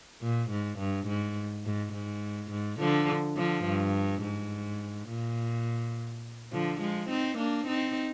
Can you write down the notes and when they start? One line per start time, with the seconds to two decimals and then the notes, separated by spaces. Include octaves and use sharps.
0.22 A#2
0.50 G#2
0.79 G2
1.07 G#2
1.65 G#2
1.93 G#2
2.51 G#2
2.79 D3 F3
3.37 D3 F3
3.65 G2
4.23 G#2
5.09 A#2
6.52 D3 F3
6.81 F3 G#3
7.09 C4 D#4
7.38 A#3 D4
7.67 C4 D#4